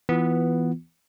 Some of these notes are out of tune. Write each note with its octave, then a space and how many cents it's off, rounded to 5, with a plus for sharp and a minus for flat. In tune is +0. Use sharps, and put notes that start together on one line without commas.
E3 +5 B3 +0 F4 +0